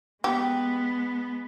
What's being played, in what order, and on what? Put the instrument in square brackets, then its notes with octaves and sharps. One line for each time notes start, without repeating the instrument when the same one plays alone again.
[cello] G#3 B3 [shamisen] G4